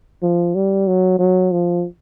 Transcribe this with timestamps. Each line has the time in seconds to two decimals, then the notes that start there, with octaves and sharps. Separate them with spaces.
0.23 F3
0.55 G3
0.88 F#3
1.19 F#3
1.52 F3